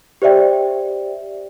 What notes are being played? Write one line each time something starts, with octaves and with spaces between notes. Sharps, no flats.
G4 C5 D5 E5 G5